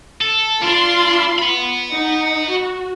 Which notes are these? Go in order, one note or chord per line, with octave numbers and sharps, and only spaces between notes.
A4
D4 F4 C6
F#5 B5
D#4
F#4